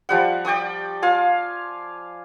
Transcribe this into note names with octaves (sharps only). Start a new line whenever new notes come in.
F3 G3 F#5
D5 G5 C#6 D#6
F4 F5 G#5